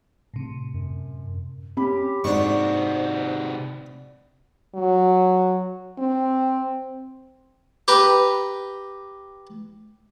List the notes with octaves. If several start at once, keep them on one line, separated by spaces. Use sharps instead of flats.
A2 C3
F#2
C4 C#4 G4 B5
G#2 C3 D4 F#4 C5 C#6
F#3
C4
G4 B4 A#5